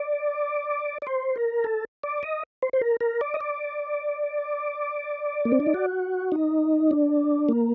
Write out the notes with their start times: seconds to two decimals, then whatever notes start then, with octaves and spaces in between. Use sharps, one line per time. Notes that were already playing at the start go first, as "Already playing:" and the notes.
Already playing: D5
1.02 D5
1.07 C5
1.36 A#4
1.64 A4
2.03 D5
2.23 D#5
2.62 C5
2.73 C5
2.81 A#4
3.01 A#4
3.21 D5
3.34 D#5
3.41 D5
5.45 A#3
5.52 C4
5.60 D4
5.67 D#4
5.74 F#4
6.32 D#4
6.91 D4
7.49 A#3